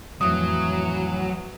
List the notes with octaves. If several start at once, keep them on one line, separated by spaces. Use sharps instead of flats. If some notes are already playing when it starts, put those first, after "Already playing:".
F2 A2 E3 F#3 D#6